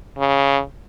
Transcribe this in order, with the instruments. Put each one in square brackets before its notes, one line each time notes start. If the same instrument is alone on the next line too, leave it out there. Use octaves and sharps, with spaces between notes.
[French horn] C#3